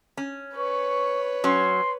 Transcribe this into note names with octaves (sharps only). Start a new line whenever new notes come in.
C#4
B4 C#5 C#6
F#3 C#4 C6